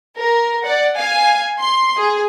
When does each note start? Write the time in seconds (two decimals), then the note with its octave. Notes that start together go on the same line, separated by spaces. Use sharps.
0.17 A#4
0.63 D5 F#5
0.95 F5 G#5
1.59 C6
1.97 G#4